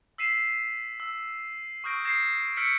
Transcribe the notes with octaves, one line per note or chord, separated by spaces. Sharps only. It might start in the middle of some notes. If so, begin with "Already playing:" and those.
E6 B6 C7 D#7 E7
E6
C#6 D#6 F6 G6 A#6 D7
G6 G#6 A#6 C7 E7
E6 F6 G6 B6 C#7 D7